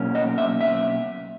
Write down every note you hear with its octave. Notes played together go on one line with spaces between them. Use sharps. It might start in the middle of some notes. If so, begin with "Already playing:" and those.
Already playing: B2 F#3 A#3 C#4
D#5
E5
E5